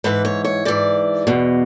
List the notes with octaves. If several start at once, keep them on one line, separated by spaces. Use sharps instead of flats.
G#2 E3 B4
C#5
C#5
G#2 E3 D5
E2 B2